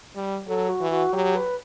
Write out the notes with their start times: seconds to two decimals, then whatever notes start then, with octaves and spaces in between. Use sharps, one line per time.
0.15 G3
0.47 F#3 A4
0.69 F#4
0.80 E3
0.91 F#4
1.13 F#3 G4
1.35 B4